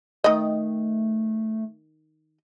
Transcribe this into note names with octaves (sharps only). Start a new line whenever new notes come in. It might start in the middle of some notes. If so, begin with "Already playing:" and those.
D#3 A3 D#5